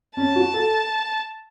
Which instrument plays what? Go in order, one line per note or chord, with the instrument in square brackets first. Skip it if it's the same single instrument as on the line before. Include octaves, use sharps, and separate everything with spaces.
[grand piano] C#4 [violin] A5
[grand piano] F#4
A4